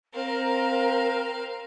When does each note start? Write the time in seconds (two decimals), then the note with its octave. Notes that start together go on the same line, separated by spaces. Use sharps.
0.14 C4 A#4 F5 A#5